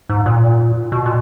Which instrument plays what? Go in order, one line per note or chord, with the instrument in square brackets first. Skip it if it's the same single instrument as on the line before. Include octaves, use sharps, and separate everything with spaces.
[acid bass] G#2
A#2
B2
A#2